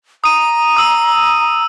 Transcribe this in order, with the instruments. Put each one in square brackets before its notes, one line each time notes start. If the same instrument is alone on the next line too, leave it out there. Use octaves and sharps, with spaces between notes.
[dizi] A#5 [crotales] D#6 D#7
[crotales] D#6 E6 D#7